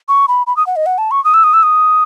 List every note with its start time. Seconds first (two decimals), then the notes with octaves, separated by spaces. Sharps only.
0.09 C#6
0.28 B5
0.47 B5
0.57 D#6
0.67 F#5
0.76 D#5
0.86 F#5
0.98 A5
1.11 C#6
1.25 D#6
1.34 E6
1.44 D#6
1.54 E6
1.63 D#6